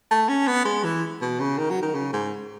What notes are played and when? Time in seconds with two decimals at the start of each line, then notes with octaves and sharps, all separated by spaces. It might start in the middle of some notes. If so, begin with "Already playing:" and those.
0.11 A3
0.29 C#4
0.47 B3
0.65 G#3
0.84 E3
1.21 B2
1.40 C#3
1.58 D#3
1.70 F#3
1.82 D#3
1.94 C#3
2.13 G#2